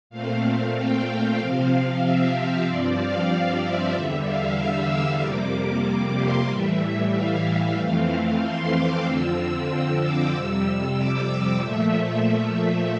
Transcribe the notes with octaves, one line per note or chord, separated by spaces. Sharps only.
A#2 A3 C4 F5
G5
C3 F3 C4 F5
E5
G2 F3 C4 D5
F5
E5
E2 D3 G3
F5
E6
F2 C3 G3 A#3 D6
C6
A2 E3 G3 E5
F5
F2 E3 A3 C4
C6
D6
F2 D3 F3 C4 E6
E6
D6
F2 C3 G3 E6
D6
D6
A#2 F3 A3 E5